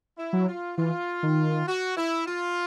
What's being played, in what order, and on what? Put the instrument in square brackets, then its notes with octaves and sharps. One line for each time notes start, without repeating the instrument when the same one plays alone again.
[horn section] E4
[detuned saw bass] F#3
[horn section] F4
[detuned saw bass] E3 [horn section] F4
[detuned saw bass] D#3
[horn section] F#4
E4
F4